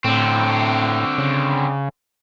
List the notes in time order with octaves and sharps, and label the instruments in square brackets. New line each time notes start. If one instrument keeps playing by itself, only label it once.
[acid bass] A2 [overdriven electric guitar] D3 C4
[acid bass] C#3